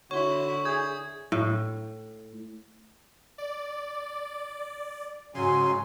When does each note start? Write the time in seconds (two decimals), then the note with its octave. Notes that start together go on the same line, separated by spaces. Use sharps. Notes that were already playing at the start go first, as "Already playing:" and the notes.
0.11 D3 E4 F#4 C#5 C6 C#6
0.65 G#4 D#6 G6 G#6
1.32 A2
3.38 D5
5.35 G#2 C#3 F#3 G#5 C6